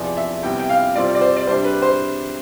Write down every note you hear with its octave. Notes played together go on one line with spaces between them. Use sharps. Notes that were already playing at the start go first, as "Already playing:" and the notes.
Already playing: E2 C3 F3 D5
E5
C3 G3 B3 E4 G5
G5
F5
C3 G3 C4 F4 D5
D5
C5
D5
C3 G3 D4 C5
B4
C5